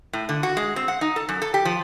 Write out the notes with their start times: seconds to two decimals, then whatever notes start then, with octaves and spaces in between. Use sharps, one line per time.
0.13 A2
0.29 D3
0.43 F#4
0.57 G#3
0.76 C4
0.88 F#5
1.01 D#4
1.16 A4
1.29 F#2
1.42 A4
1.54 G4
1.65 F3